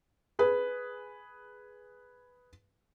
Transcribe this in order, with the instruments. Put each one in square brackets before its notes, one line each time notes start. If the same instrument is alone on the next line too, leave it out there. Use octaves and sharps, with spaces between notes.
[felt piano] G#4 B4